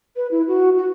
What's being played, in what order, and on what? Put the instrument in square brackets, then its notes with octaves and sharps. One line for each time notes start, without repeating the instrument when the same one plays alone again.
[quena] B4
E4
F#4
F#4